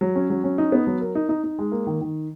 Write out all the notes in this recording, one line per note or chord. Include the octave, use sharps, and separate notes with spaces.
F#3
C#4
F#3
C#4
D#4
B3
F#3
A#4
D#4
D#4
D#4
G#3
A#3
D#3
D#3